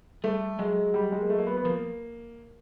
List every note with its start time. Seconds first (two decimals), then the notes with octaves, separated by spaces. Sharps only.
0.24 G3 A3
0.59 F#3 G#3
0.94 G3
1.12 G#3
1.21 A#3
1.30 A3
1.38 A#3
1.47 B3
1.57 B3
1.65 F3 A#3